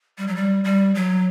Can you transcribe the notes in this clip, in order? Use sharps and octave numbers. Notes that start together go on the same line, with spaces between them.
G3
F#3
G3
G3
F#3